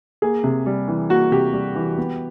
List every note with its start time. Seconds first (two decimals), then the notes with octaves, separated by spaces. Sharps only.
0.22 A#3 G#4
0.44 C3
0.66 G3
0.88 E3
1.09 A#3 F#4
1.31 C3 G4
1.53 G3
1.76 E3
1.98 B3